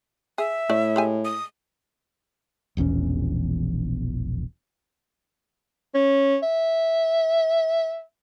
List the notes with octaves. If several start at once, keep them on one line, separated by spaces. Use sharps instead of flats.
G#4 E5
A2 A3 D5
G#3 G4 G#5
D#6
E1 A#1 E2 C#4
C#4
E5